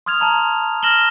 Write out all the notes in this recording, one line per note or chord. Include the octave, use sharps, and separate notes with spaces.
C6 D#6 F6 G#6 F7
A5 A#5 C6
F6 A#6 E7 F#7 G7